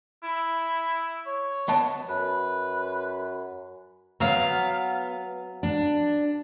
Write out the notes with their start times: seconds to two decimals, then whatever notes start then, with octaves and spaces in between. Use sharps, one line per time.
0.23 E4
1.26 C#5
1.68 B3 D#5 A5
2.09 F#2 B4
4.20 F#3 B3 F5
5.63 D4